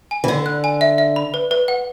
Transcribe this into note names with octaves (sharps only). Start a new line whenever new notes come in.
G#5
E3
D3 D5
F#6
G#5
E5
E5
B5
B4
B4
F#5